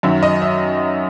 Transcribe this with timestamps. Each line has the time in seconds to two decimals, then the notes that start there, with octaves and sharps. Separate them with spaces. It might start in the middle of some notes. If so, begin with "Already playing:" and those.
0.03 F#2 D#3 F#3 E5
0.23 D#5
0.42 E5